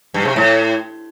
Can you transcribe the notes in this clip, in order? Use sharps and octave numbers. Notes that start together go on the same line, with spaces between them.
G2
C3
A2